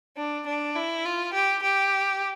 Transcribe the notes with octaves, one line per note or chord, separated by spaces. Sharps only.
D4
D4
E4
F4
G4
G4